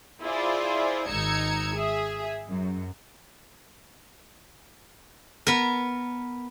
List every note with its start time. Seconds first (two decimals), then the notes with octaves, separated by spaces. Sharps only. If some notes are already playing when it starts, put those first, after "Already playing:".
0.22 E4 F4 G#4 C5 D5
1.08 G#1 D#4 A#5 E6 G#6 C#7
1.75 G#4 E5
2.49 F#2
5.47 B3 A#4